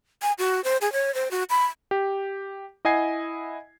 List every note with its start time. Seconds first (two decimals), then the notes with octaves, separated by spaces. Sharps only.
0.22 G#5
0.39 F#4
0.64 C5
0.81 G#4
0.93 C#5
1.14 C5
1.31 F#4
1.50 B5
1.91 G4
2.85 E4 D#5 F#5 G#5 G#6 C7